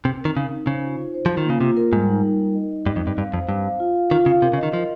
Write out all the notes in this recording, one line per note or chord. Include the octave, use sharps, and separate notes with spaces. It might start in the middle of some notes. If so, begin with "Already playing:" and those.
C3 C4
D#3 A#4
C#3 D#4
D#4
C#3 C5
F4
F4
C5
F3 F4
D#3
C#3 A#3
C3 F4
A#4
G#2 G3
D#4
D#4
D#4
D#5
D#5
G2 D#5
F2
G2 C4
G2 F5
F2 C5
G2 F5
F5
F4
F5
D#3 F4
C#3 F5
C3 A#4
C#3
D#5
D#3
F3 A#4